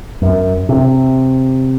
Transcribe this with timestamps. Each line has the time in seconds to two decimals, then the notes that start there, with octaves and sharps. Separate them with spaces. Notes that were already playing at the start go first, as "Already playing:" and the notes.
0.22 F#2
0.69 C3